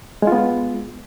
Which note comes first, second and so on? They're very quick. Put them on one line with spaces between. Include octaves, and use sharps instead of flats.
G#3 F4 B3